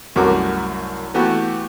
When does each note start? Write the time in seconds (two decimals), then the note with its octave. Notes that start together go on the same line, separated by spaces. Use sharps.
0.16 C2 F#2 A3 F#4 A#4 D6
1.14 E3 A3 B3 F#4 G4